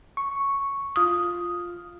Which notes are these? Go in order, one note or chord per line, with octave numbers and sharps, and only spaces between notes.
C#6
F4 D#6 F6